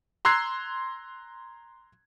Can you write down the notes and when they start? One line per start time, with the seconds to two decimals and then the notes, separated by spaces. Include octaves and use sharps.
0.25 A#5 C6 E6 F#6 G#6 C7